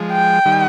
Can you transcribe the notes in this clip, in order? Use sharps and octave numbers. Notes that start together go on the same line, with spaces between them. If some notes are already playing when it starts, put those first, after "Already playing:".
Already playing: F3 G#3
G5
D#3 G3